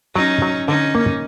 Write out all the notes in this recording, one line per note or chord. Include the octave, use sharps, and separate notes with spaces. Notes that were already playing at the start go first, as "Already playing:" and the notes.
F#3 C#4 D#4
F#3
D3 C#4 D#4
A#3